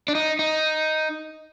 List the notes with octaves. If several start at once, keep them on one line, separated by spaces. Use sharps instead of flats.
D4
D#4
D#4